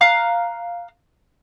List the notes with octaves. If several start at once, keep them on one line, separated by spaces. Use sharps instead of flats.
F5 A#5 F#6